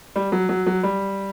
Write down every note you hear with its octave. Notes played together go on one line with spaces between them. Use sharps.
G3
F#3
F#3
F#3
G3